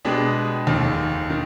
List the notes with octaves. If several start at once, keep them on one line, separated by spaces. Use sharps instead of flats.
B2 G#3 B3 D4 G4
F1 D#2 D#3
D#3